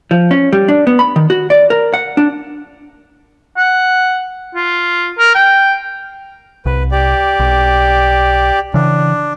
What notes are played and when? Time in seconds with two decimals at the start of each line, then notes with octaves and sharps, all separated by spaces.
0.11 F3
0.31 C#4
0.53 G3
0.68 D4
0.87 B3
0.99 B5
1.16 D#3
1.30 F#4
1.50 D5
1.70 A#4
1.94 F#5
2.17 D4
3.57 F#5
4.55 F4
5.19 A#4
5.35 G5
6.66 C2 B4
6.91 G4 D5
7.39 B1
8.74 C#3 E3 D4